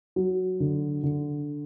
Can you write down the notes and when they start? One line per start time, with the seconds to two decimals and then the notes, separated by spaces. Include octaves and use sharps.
0.16 F#3
0.60 D3
1.03 D3